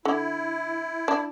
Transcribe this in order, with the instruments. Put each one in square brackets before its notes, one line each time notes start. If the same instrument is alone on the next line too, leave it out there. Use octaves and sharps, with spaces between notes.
[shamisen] D3 [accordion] E4
[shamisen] D4